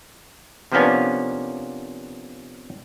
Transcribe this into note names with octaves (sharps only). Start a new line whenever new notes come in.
C3 F3 A#3 B3 C#4 D4